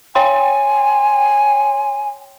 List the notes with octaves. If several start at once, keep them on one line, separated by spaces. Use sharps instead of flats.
C#5 G5 G#5 C6